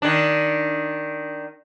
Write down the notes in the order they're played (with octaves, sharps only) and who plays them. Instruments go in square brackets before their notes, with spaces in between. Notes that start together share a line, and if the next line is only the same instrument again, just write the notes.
[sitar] D#3 D4